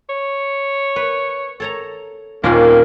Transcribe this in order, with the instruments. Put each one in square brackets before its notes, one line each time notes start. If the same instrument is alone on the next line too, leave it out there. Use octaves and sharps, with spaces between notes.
[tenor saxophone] C#5
[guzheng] B4
A4 C#5 A#5
[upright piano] D#2 A#2 [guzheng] D#3 C4 C#4 [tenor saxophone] A#3